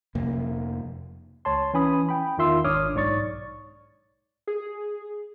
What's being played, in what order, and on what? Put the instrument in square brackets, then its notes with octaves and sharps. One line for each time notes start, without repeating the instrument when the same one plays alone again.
[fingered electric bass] F1 F2 C3 A#3
[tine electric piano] C#2 C#5 A5 C6
E3 C#4 G#5 B5 D#6
G5 B5
E2 D#3 F4 E5 C6 E6
G#1 D4 C#5 D6 D#6 F6
B1 G#2 C#5 D5 C#6 A6
[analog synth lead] G#4